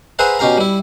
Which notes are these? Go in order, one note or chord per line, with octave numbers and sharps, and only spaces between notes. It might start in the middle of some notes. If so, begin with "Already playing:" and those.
G#4 B4 C5 E5 F#5 A#5
B2 C#4 G4 F5 A#5
G3 E4